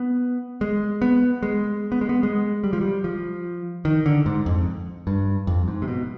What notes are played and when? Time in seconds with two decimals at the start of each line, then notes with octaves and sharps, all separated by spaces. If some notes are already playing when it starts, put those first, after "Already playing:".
Already playing: B3
0.61 G#3
1.02 B3
1.43 G#3
1.92 B3
2.01 G#3
2.09 B3
2.23 G#3
2.64 G3
2.73 F3
2.81 G3
3.04 F3
3.85 D#3
4.06 D3
4.26 G#2
4.46 F2
5.07 G2
5.47 F2
5.68 G#2
5.82 C3
5.88 B2